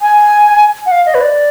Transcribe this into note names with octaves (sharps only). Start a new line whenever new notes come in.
G#5
F#5
F5
D#5
B4
D5